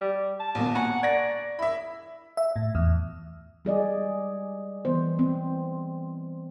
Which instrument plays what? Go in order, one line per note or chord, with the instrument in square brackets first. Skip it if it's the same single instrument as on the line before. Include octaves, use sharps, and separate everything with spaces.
[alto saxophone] G3
A5
[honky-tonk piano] A#1 D#2 B2
[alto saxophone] F#5 [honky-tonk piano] G#5 A#5 C#6
[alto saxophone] D5 [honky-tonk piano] G#6 A#6
[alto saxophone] E4 [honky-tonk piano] E5 B5
[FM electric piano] E5
A2
E2
[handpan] G3 G#4 D5 D#5
E3 B3 C5
C4